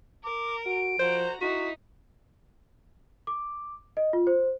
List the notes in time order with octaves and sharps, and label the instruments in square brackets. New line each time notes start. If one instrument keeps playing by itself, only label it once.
[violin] A#4 [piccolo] D6
[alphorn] F#4 [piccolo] D7
[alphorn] F3 [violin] F#4 A#5 [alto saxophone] C5
[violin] D#4 [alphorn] E4 [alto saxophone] F#4 [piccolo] B6
[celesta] D6
D#5
F4
C5